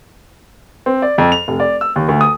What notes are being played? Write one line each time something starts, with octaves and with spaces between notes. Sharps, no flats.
C4
D5
F2
F7
F1
D5
E6
D#2
D2
D#6